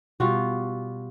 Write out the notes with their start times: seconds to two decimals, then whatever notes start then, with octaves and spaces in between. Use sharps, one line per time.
0.20 B2 G3 F4 F#4